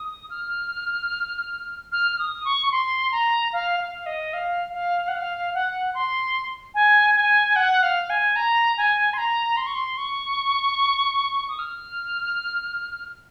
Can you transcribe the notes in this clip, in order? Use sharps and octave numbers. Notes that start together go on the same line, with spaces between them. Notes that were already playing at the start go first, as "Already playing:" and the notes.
Already playing: D#6
F6
F6
F6
D#6
C#6
C#6
C6
A#5
F5
F5
D#5
F5
F5
F#5
F5
F#5
C6
G#5
G#5
F#5
F5
G#5
A#5
G#5
C6
A#5
C6
C#6
C6
C#6
D#6
F6